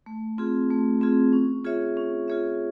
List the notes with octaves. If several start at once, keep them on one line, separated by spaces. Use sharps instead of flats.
A3
C4 F4 G#4
A3
C4 F4 G#4
C#4
F4 G#4 C#5 E5
C#4
F4 G#4 C#5 E5